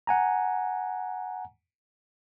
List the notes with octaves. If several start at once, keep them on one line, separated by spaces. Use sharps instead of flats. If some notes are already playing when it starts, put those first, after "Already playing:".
F#5 G#5 A#5